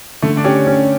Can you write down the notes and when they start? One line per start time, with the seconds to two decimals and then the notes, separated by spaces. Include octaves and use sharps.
0.22 D3 A3
0.37 D4
0.44 C#4 G4
0.67 C#4